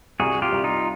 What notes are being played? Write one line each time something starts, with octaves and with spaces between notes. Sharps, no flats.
C2 F#4 G#4
F4 G4
C2
D#4 F4